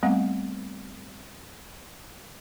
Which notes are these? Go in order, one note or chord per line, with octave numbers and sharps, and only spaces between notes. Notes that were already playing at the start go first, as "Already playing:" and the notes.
G3 A3 B3 C4 F5 F#5